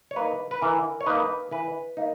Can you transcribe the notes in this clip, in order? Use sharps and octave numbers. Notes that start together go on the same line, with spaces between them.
C#5
A#3 D#4 B4
B4
E3 A#4
C#5
A#3 D#4 B4
E3 B4
A#3 D#4